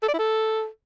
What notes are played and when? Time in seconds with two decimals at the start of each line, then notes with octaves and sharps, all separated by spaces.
0.03 A4
0.08 D5
0.13 E4
0.19 A4